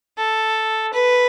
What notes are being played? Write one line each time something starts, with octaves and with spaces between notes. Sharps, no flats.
A4
B4